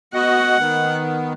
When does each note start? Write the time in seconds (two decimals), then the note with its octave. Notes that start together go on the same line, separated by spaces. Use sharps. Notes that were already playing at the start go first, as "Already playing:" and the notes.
0.14 B3 F#4 D#5 F#5
0.58 D#3 B3